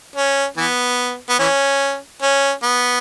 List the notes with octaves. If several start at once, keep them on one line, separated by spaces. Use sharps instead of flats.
C#4
E3 B3
B3
E3 C#4
C#4
B3